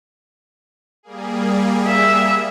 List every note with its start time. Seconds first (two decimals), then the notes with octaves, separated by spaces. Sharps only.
1.03 G3 A#3 G#4
1.87 E5